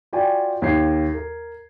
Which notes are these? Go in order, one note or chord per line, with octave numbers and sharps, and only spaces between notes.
F4 F#4 D5 G5 G#5
D#2 G#6 C7
A#4